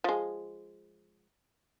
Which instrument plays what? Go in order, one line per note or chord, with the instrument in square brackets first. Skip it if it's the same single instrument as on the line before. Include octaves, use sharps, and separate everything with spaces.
[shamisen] F3 G#3